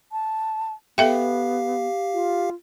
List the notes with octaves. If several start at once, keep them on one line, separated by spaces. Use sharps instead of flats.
A5
B3 G4 A4 E5 F5 G5
F4